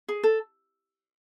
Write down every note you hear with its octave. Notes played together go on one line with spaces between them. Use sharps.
G#4
A4